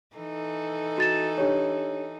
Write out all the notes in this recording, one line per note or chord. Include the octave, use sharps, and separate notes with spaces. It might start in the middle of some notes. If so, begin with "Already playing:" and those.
E3 D#4 A4
F#4 A6 E7
D4 G4 C#5